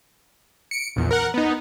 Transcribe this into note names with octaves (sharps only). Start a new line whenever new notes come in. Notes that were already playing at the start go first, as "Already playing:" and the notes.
C#7 D7
A#1 E2
A#4 F#5
B3 D#4